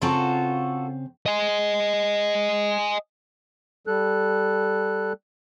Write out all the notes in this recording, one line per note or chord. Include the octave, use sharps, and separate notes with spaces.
C#3 C4 F4 F#4 A4 A#5
D#5 G#5
G3 A4 F#6